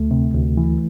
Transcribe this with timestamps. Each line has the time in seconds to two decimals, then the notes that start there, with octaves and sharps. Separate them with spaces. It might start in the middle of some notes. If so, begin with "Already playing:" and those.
Already playing: D2 A3
0.11 C3
0.34 D2
0.57 E3